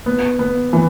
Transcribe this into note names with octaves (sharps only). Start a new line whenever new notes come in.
B3
B3
E3